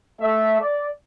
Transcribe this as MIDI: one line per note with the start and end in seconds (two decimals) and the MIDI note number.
0.21 0.56 57
0.21 0.56 76
0.60 0.87 74